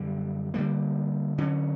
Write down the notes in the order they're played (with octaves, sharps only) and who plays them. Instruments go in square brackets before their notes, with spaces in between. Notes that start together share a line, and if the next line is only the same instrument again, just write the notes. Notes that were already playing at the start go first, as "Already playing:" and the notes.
Already playing: [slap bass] F#2 D3 G3
D3 G3 A#3
D3 F#3 C#4